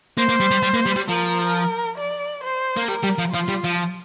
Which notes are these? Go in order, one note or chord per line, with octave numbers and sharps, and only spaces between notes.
A#3 C5
A#3
G3
G3
G3
A#3
G3
G3
F3 A#4
D5
C5
A#3
G3 A#4
G3
F3
F3 F4
G3
F3